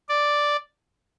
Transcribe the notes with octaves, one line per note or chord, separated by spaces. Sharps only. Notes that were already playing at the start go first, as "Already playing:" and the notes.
D5